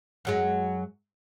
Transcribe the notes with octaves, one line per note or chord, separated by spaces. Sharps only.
F#2 F#3 G#3